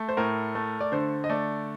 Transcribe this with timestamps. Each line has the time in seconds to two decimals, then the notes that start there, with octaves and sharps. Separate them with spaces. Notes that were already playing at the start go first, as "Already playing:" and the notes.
Already playing: A3
0.09 C5
0.17 A2 A#4
0.55 A3
0.80 D5
0.92 D3 C5
1.24 D#5
1.29 A3 D5